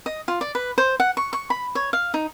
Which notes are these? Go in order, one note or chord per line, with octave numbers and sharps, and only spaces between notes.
D#5
F4
D5
B4
C5
F#5
C#6
C#6
B5
C#5
F5
D#4